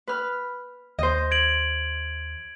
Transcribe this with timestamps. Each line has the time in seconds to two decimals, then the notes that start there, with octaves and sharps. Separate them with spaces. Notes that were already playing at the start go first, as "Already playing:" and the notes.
0.07 B4 F6
0.99 D#2 C5 D#5
1.31 G#6 D7 F#7